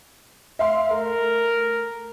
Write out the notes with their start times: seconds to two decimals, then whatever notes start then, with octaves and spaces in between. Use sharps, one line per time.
0.59 E5 F5 C6
0.91 A3 A#4